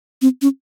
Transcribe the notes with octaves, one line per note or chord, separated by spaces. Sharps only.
C4
C#4